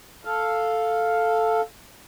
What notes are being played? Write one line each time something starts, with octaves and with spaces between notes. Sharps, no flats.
A4 F5